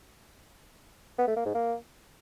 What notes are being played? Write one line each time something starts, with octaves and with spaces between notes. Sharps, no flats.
B3
A3
A#3
G#2
A#3